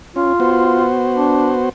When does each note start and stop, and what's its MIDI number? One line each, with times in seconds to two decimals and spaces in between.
0.16 0.33 61
0.16 0.86 65
0.40 1.69 59
0.40 1.69 66
0.40 1.69 72
1.14 1.54 62